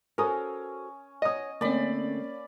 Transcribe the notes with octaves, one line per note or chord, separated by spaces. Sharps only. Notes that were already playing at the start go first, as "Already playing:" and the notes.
C#4 F#4 A4 A#4 C5 D#6
C#5 D#5 F#5 D#6
D3 A3 A#3 C4 C#4 D5 B5